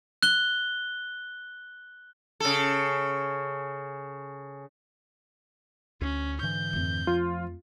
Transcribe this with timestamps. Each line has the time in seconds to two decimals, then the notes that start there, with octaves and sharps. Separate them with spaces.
0.23 F#6 G7
2.40 C#3 A4
6.01 D2 C#4
6.41 G#2 D3 E3 G6
6.73 F2 A3
7.07 F3 F4